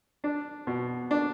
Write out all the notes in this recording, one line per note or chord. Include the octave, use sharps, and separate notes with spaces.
D4
B2
D4